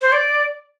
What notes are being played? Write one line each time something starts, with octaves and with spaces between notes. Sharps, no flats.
C5
D5